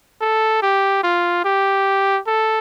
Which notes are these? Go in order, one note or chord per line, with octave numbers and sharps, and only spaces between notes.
A4
G4
F4
G4
A4